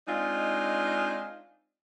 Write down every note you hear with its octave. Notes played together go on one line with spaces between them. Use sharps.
G#3 C4 D4 D#4 F4